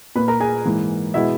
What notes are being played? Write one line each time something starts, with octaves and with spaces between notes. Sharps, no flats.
A#2 A#3 B4 B5
A#4 A#5
G#4 G#5
G#2 E3 A#3
B2 G#3 B3 E4 E5